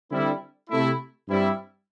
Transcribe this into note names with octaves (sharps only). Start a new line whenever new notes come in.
D3 G3 C4 E4
C3 A3 E4
G2 G3 C4 E4